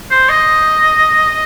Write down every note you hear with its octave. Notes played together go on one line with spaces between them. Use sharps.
C5
D#5